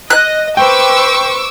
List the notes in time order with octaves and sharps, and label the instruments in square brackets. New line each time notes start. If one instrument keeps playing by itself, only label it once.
[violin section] D#5 [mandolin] F#6
[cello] B4 C5 [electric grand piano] G5 [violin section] C#6 D6 E6